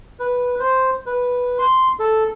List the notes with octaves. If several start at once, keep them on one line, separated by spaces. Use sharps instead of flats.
B4
C5
B4
C6
A4